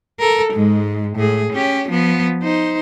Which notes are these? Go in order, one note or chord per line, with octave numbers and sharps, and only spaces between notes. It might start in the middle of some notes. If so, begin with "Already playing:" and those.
A4 A#4
G#2 G#3
A2 G#4
C#4 G4
F3 B3
D#4 C5